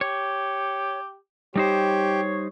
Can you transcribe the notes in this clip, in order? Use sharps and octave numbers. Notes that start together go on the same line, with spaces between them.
G4 C#5
G3 D#4 G4 C5 C#5